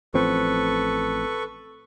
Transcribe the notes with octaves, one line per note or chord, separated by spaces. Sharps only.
A1 F3 C4 A4 B4 C#6